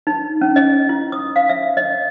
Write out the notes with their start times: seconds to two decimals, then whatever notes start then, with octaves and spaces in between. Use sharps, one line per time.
0.07 D#4
0.41 C#4
0.56 D#5
0.89 E4
1.12 D#6
1.36 F5
1.49 E5
1.77 D#5